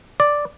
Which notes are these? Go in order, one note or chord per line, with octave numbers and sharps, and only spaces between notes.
D5